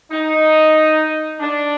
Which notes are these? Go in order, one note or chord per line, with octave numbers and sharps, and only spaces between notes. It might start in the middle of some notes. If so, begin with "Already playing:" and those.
D#4
D4